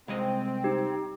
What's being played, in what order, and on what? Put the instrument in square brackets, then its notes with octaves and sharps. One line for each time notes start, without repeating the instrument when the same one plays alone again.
[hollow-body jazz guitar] C2 G#3 D#5 [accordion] C4
[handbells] D#4 G4